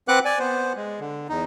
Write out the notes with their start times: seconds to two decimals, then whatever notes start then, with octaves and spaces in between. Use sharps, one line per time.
0.08 C4 B4 F#5 D6 F#6
0.25 D5 G#5
0.39 B3 C5
0.76 G#3
1.00 D3
1.29 E2 D#4